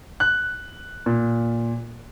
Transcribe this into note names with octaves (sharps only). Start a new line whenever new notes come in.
F#6
A#2